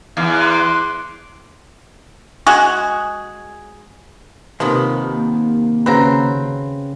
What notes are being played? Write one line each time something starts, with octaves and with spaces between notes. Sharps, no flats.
E2 F5 D6
C6 D6 F#6
G#3 F#4 G#4
D#2 C3 D#3 F3 B3
A#3
C#3 C4 F#4 B4 A#5